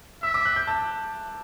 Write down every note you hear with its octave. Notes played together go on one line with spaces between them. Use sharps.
E5 E6
D6
F#6
G6
A5